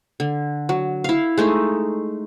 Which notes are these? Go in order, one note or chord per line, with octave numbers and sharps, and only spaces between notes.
D3
F#3
E4 F5
G#3 A3 D#4